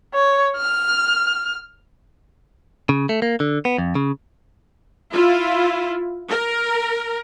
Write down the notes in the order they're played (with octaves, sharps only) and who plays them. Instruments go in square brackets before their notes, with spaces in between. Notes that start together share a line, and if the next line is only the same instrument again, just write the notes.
[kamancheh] C#5
F6
[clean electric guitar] C#3
A3
A#3
D3
B3
F2
C#3
[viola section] E4 F4
A#4